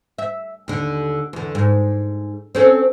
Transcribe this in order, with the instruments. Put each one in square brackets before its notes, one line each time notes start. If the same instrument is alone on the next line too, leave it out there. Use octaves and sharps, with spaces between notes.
[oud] E5
D#2 D3
E2 D3
G#2
C4 C#4 A4